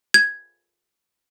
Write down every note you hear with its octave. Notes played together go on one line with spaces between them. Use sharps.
G#6